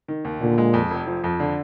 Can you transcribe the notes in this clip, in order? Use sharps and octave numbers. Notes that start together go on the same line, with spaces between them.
D#3
D#2
A#2 D3
G#3
F2
F1
F3
F2
D3